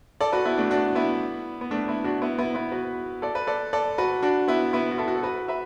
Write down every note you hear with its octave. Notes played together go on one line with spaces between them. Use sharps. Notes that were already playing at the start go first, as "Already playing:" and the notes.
A4 D5
F#4 B4
B3 E4
A3 D4
D4 F#4
B3 E4
B3
A3 D4
B3 E4
D4 F#4
B3 E4
B3 E4
B3 E4
F#4 B4
A4 D5
B4
A4 D5
A4 D5
F#4 B4
D4 F#4
B3 E4
B3 E4
F#4
E4 A4
F#4
A4
F#4 B4
B4 E5